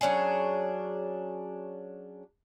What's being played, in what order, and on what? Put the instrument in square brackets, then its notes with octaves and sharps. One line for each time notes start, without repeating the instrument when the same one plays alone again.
[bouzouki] F#3 C#4 D4 G#4